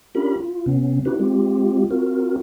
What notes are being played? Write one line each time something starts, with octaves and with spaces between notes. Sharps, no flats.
C#4 D4 F4 G4 A#4 B5
F4
C3 B3 C#4
C#4 D#4 E4 F#4 G4 B4
G#3 C4 F4 G4
C4 F4 F#4 A#4